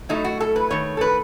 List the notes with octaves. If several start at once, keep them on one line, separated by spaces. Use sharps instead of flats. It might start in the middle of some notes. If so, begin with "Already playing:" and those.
A2 F#3 A3 D#4
F#4
A4
B4
D#3 A3 C#5
A4
B4